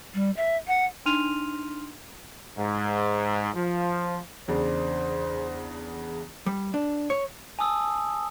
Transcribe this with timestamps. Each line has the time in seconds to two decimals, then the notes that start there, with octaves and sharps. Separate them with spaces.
0.14 G3
0.37 E5
0.68 F#5
1.06 D4 D#4 C6 F6 D#7 F7
2.57 G#2
3.54 F3
4.48 E2 C#3 D4 C5
6.46 G3
6.74 D4
7.10 C#5
7.59 G#5 A5 D#6 E6